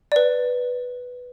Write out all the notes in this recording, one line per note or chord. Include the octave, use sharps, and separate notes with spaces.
B4 D5